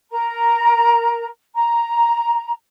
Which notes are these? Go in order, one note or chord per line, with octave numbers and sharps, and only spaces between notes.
A#4 A#5
A#5